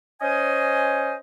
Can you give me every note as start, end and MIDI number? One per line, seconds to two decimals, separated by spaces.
0.22 1.15 61
0.22 1.15 72
0.22 1.15 75
0.22 1.15 80